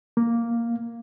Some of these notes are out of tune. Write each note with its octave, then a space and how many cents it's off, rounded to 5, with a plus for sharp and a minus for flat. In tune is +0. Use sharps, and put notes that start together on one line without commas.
A#3 +0